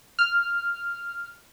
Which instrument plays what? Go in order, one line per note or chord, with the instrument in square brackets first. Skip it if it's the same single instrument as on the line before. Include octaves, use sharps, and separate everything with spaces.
[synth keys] F6